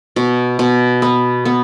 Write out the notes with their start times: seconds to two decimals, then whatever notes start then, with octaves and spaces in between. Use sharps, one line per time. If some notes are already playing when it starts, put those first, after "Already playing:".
0.16 B2
0.59 B2
1.02 B3
1.45 B3